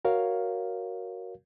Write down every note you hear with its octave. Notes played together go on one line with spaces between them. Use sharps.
F#4 A#4 C#5 F5